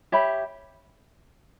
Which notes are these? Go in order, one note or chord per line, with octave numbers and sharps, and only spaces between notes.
G4 C#5 E5 B5